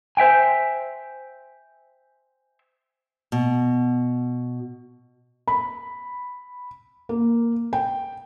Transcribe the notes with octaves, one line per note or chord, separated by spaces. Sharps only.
C5 E5 G5 G#5
B2
B5
A#3
G5